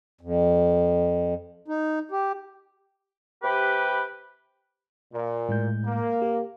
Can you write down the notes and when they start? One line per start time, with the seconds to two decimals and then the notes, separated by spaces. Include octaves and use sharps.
0.21 F2
1.68 D#4
2.11 G4
3.42 C3 G4 B4
5.13 A#2
5.49 A2 G#3 G6
5.84 A#3
6.22 G4